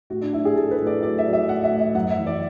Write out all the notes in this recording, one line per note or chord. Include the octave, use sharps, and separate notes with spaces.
A2 F#4
D4
F#3 E4
G#4
A2 A4
B4
A2
D5
F#3 D5
E5
F#3
E5
A2 F#5
E5
A2
E5
F#2 F#5
E5
E3
D5